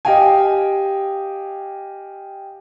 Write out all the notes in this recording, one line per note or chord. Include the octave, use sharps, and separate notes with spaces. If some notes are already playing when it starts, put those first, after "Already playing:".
G4 D#5 F5 G5 G#5